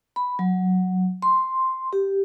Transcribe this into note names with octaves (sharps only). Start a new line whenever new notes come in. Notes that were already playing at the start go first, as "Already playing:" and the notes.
B5
F#3
C6
G4